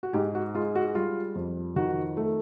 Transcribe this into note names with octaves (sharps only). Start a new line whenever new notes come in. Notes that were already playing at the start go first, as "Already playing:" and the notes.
F#4
G#2 G4
F#4
G#3 F4
F#4
G3 F4
F2
D#3 F#4
A3